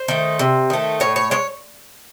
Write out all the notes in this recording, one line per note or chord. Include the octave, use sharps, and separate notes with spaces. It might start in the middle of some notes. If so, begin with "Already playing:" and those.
Already playing: C5
D#3 A3
C3
D#3 A3
A2 C#5
C#5
G#3 C#5